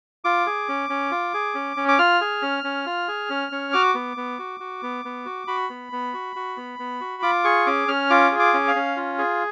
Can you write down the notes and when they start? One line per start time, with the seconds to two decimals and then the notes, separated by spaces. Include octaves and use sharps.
0.24 F4 D6
0.47 G#4
0.69 C#4
0.90 C#4
1.11 F4
1.34 G#4
1.55 C#4
1.77 C#4
1.88 D6
1.99 F4 F6
2.21 G#4
2.42 C#4
2.64 C#4
2.86 F4
3.08 G#4
3.30 C#4
3.52 C#4
3.73 F#4 D6
3.95 B3
4.17 B3
4.39 F#4
4.60 F#4
4.83 B3
5.05 B3
5.26 F#4
5.47 F#4 B5
5.70 B3
5.92 B3
6.14 F#4
6.36 F#4
6.57 B3
6.79 B3
7.01 F#4
7.23 F4 D6
7.44 G#4 C#6
7.66 C#4 D6
7.88 C#4 F6
8.10 F4 D6
8.32 G#4
8.39 D6
8.54 C#4
8.68 F5
8.76 C#4
8.97 F4
9.19 G#4